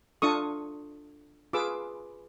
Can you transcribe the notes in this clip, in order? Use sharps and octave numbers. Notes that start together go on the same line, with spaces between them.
D4 F4 A4 C#6 D#6
F4 G#4 B4 D6 E6